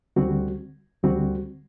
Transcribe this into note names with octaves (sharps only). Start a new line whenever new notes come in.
D2 D3 G3 C4 F#4
D2 D3 G3 C4 F#4